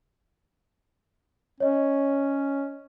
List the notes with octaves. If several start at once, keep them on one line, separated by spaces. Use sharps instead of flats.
C#4 C#5 D#5